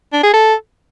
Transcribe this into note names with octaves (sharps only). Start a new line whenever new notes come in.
D4
G#4
A4